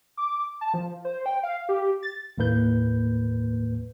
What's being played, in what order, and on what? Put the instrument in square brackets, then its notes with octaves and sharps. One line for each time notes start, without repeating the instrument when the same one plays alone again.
[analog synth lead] D6
A5
F3
C5
G5
F5
G4
A6
[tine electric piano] D#2 A2 A#3 B4 G6